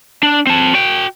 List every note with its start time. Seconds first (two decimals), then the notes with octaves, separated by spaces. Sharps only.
0.23 D4
0.47 C4 A5
0.74 F#4 G5